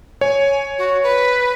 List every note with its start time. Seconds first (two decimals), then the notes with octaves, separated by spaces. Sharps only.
0.21 C#5 G#5
0.78 F#4
1.03 B4